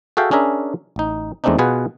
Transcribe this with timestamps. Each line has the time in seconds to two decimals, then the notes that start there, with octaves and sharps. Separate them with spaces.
0.17 F#4 G#4 A4 E5 F5 G5
0.31 C#4 D4 G#4 A#4 E5
0.96 A1 D#4
1.44 E2 G#3 A3 C4 D4 D#4
1.59 B2 F4 G#4 B4 F#5